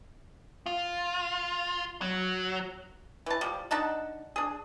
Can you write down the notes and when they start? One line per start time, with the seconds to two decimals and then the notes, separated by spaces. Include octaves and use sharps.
0.66 F4
2.01 F#3
3.26 E3 A5
3.41 F3 G3
3.71 D4 D#4 F#5 A5
4.36 D4 G#4